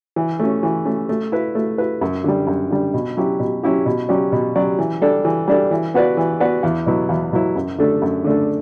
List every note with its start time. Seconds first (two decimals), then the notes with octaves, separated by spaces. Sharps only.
0.16 E3
0.40 A3 C#4
0.63 E3
0.85 A3 C#4
1.09 A3
1.32 E4 B4
1.55 A3
1.78 E4 B4
2.01 F#2
2.24 D3 G3
2.47 F#2
2.71 D3 G3
2.94 B2
3.17 F#3 C#4 E4 G4
3.40 B2
3.63 F#3 C#4 E4 G4
3.86 B2
4.09 F#3 C#4 G4 D5
4.32 B2
4.55 F#3 C#4 G4 D5
4.79 E3
5.02 G3 D4 A4
5.25 E3
5.48 G3 D4 A4
5.71 E3
5.94 B3 F#4 B4 D5
6.17 E3
6.40 B3 F#4 B4 D5
6.63 E2
6.86 B2 F#3 B3 E4
7.09 E2
7.32 B2 F#3 B3 E4
7.56 F#2
7.79 D3 A3 D4 A4
8.02 F#2
8.24 D3 A3 D4 A4